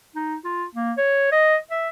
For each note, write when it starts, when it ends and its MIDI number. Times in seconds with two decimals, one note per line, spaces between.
0.16 0.36 63
0.45 0.65 65
0.75 0.92 58
0.98 1.29 73
1.32 1.56 75
1.71 1.89 76